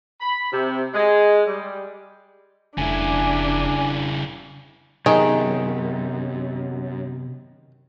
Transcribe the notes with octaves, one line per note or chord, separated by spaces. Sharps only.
B5
C3
G#3
G3
F1 C#3 D4 E4 G#5
F#2 C3 D#3 B3 D#4 G4 G#4